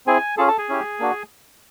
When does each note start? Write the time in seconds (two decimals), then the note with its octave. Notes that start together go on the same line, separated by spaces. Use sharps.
0.06 C4 E4 G#4 G#5
0.37 C#4 F4 G#4 A4 A5
0.48 A4 A5
0.58 G#4 G#5
0.69 C#4 E4 G4
0.99 A#3 D4 F#4